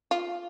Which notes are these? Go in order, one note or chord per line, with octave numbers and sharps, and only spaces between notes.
F4